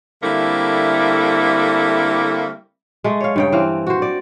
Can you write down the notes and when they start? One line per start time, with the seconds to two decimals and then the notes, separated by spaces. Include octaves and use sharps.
0.23 D3 G3 A3 A#3 C4 E4
3.04 G#3 A3
3.21 C#5 F5
3.36 G2 C#3 G5
3.52 E3 C4 F5
3.87 F#4 C5
4.02 D5